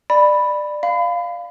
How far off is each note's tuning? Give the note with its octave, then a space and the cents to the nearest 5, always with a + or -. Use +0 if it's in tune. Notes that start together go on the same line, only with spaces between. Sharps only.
D5 +20 B5 +0
F5 +0 B5 +25